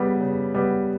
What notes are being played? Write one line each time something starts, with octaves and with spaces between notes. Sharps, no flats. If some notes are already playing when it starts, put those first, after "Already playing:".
Already playing: C#3 G3 B3
C#3
G3 B3